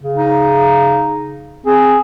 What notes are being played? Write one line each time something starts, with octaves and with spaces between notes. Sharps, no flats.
C#3
D#4
C4 G#4